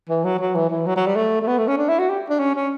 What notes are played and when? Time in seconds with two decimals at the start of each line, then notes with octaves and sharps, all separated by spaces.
0.09 E3
0.24 F#3
0.39 F#3
0.55 E3
0.70 E3
0.86 F#3
0.96 F#3
1.06 G3
1.16 A3
1.41 A3
1.47 B3
1.58 A3
1.68 C#4
1.77 D4
1.89 E4
1.99 F#4
2.09 G4
2.29 D4
2.39 C#4
2.55 C#4